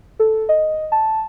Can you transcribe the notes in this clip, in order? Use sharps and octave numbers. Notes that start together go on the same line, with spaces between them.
A4
D#5
A5